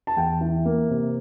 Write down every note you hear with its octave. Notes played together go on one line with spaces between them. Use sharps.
A5
E2 G5
E3
A#3
C3